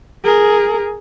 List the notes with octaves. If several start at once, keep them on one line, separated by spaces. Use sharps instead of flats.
G#4 A#4